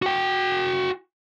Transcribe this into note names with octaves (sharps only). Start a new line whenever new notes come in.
F#4 G5